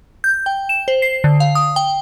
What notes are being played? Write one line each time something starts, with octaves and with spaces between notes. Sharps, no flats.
G6
G5
E7
C5
C7
D3
F5
D#6
G5